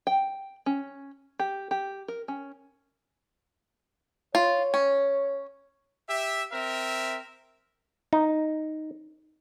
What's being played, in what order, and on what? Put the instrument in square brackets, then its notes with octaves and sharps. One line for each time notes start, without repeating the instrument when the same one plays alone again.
[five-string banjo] G5
C#4
G4
G4
A#4
C#4
[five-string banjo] F4 [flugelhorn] C#5
[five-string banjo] C#4
[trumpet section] G4 E5
C4 A#4 E5
[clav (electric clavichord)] D#4